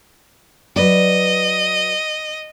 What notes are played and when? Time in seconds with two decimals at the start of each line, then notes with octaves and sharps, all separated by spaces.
0.76 F#3 B4 D5 D#5